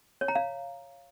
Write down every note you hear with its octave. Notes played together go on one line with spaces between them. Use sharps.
C#5
A#5
F5